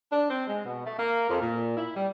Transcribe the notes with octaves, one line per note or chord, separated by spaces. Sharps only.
D4
C4
G#3
B2
A3
A#3
F2
A#2
E4
G3